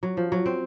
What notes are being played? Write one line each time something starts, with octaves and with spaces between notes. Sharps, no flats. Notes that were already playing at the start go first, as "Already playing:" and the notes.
F#3
F3
F#3
C4